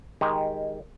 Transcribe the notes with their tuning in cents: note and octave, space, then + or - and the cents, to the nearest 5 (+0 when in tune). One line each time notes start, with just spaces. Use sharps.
D#3 +0 G#3 -10 G4 +0